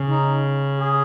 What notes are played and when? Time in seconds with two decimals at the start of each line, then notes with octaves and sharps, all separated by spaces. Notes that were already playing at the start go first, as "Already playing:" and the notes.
Already playing: C#3
0.10 D#4
0.79 G#4